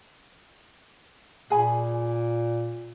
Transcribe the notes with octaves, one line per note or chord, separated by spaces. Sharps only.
A#2 G#4 G#5 B5